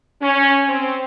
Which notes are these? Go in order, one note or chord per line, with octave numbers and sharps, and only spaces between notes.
C#4
C4